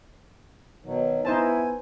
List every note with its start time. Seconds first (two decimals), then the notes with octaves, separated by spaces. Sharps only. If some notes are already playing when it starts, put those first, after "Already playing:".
0.85 B2 D#3 F#3
1.25 B3 D#4 E4 C5 G#5 A5